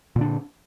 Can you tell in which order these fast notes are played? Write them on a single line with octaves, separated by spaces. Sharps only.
A#2 D3 D4